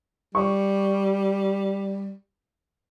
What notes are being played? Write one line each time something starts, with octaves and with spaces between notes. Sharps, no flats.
G3 C#6